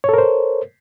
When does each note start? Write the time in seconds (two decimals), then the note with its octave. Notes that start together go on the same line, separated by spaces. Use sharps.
0.04 C#5
0.09 A4
0.13 A#4
0.18 C5